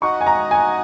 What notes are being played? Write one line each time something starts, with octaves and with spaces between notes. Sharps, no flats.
D#4 F#4 D#5 F#5 C#6
G#5
A#5
G#5